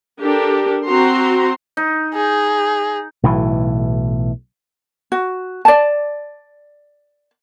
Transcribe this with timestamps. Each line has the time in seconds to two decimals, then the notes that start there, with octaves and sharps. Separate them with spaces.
0.20 D4 G4 A4 A#4
0.86 C4 F#4 A#5 C6
1.77 D#4
2.14 G#4
3.23 B1 A2 E3
5.12 F#4
5.65 D5 A5